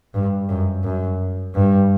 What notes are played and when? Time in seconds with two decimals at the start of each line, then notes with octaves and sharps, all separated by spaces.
0.14 G2
0.49 F#2
0.84 F#2
1.55 G2